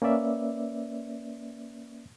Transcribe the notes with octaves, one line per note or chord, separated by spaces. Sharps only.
A#3 C#4 B4 D5 E5